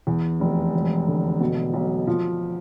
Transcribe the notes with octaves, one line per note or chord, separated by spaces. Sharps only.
E2
F1
E1
D3
B2
B1
F3